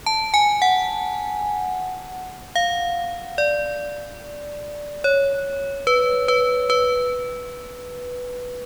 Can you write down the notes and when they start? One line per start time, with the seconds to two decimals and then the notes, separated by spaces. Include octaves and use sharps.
0.06 A5
0.34 G#5
0.62 F#5
2.56 F5
3.38 D5
5.04 C#5
5.87 B4
6.28 B4
6.70 B4